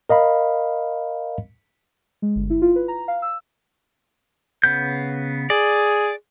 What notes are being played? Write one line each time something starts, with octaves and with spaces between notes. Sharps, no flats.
A#4 D#5 F5 B5
G#3
G1
E4
F4
B4
A#5
F5
E6
C#3 B3 G6
G#4 D5